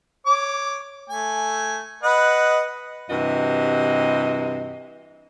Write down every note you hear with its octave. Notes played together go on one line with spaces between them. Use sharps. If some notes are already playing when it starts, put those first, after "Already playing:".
C#5 D6
A3 G#5
B4 D#5 F#5
G2 C3 E3 F#4 D#5